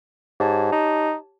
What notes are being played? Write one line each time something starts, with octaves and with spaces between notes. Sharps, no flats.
G#2 G4 C#5 A5
D#4